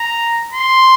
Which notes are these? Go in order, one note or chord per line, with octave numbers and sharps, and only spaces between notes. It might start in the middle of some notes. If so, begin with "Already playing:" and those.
Already playing: A#5
C6